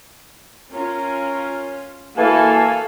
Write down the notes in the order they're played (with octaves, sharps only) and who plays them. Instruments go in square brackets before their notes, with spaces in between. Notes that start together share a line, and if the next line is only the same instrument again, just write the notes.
[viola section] C#4 F4 [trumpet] A#4
[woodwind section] E3 G#5 A5 [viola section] A#3 F#4 A4 [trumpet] F5